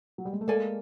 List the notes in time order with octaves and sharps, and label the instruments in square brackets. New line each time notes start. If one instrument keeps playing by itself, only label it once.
[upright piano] F#3
G3
G#3
A3
[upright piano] G#3 A#3 [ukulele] A4 D5 F5 G#5